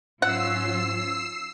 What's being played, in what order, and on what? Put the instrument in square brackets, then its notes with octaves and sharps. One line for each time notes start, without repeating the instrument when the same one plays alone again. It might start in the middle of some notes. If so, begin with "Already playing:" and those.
[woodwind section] G#2 [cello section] F#3 C#4 F4 [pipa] F#5 [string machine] E6 C7